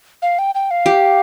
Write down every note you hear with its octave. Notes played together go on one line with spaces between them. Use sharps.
F5
G5
G5
F5
G4